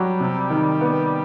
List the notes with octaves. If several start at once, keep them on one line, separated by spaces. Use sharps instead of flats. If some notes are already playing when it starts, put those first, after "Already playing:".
Already playing: F#3 G3
C3
D#3
B3